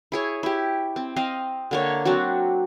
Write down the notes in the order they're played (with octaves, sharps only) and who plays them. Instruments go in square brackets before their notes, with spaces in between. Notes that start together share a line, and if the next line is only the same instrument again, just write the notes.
[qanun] E4 G#4 C#5
E4 G4
C4
C4 D#5 F5
D3 A#3 C#5
F#3 C4 D4 F#4